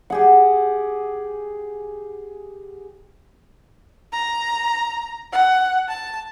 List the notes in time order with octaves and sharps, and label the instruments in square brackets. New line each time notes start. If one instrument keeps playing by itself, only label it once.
[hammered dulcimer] G4 G#4 F#5
[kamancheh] A#5
F#5
A5